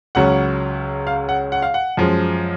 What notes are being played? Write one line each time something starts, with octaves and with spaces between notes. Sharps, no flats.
C#2 C#3 F#3 C#4 F#5
F5
F#5
F#5
F5
F#5
F#2 F3 G#3